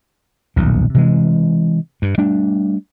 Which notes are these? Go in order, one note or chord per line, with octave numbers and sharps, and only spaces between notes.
D#1 B1 F2 A#2
C3 E3 G#3
G2
G3 A3 D4